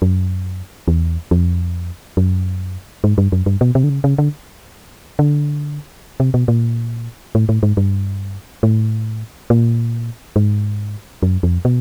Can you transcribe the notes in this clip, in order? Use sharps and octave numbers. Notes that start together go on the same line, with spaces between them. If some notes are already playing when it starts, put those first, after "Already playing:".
F#2
E2
F2
F#2
G#2
G2
F#2
G2
B2
C3
D3
C#3
C#3
D3
D3
C3
B2
A#2
A2
A2
G#2
G2
A2
A#2
G#2
F#2
F2
B2